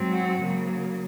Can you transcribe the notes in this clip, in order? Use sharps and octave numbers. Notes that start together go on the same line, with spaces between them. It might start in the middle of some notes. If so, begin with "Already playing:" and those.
Already playing: G#2 F#3 C4
F#4
C#3 F#3 A#3